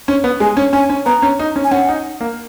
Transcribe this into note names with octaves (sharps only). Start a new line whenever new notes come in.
C#4
B3
G#3 G#5
C#4
C#4 G#5
C#4
B3 A#5
C#4
D#4
C#4
G#5
C#4 F#5
D#4
A#3